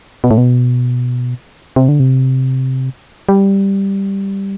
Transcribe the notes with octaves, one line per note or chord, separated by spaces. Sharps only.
B2
A2
B2
C3
D3
C3
G3